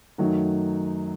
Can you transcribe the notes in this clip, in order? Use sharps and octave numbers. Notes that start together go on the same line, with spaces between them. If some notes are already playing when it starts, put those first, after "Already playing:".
F#2 D#3 F#3 A3 D#4